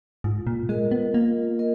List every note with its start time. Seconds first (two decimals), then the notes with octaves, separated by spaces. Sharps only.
0.24 G#2 F4
0.47 A#2
0.69 G#3 A#4 D#5
0.91 B3
1.14 A#3 F4
1.59 A#4 D#5